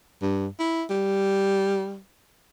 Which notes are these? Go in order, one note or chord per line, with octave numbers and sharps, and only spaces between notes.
G2
E4
G3